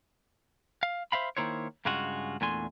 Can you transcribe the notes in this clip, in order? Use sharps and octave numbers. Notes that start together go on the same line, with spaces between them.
F5
C5 E5 F5 B5
D#3 G3 A#3 E4 C5 C#5
G2 C#3 G#3 F4 F#4
E2 A#2 A3 D4 G#5 C6